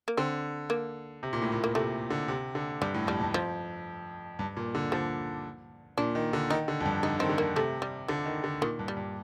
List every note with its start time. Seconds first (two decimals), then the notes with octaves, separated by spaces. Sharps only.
0.08 A#3
0.17 D3 C4
0.70 A#3
1.23 C3
1.33 A#2
1.42 A2
1.52 A#2
1.64 A#3
1.75 C3 A3
2.10 D3
2.28 C3
2.55 D3
2.81 G2 G3
2.94 A2
3.07 F2 G3
3.21 G2
3.34 F2 F3
4.39 G2
4.57 A#2
4.75 D3
4.92 D3 F3
5.98 A#2 D4
6.15 D#3
6.33 D3
6.50 D#3 D#4
6.68 D3
6.81 F2
6.86 G2
7.03 D3 D#4
7.19 D#3 C4
7.29 D3
7.38 A#3
7.56 C3 A3
7.82 G3
8.08 D3 F3
8.26 D#3
8.44 D3
8.61 A#2 D#3
8.79 G2
8.88 G3
8.97 G2